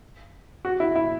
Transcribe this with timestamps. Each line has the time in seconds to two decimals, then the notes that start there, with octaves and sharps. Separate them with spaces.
0.65 F#4
0.80 E4
0.96 E4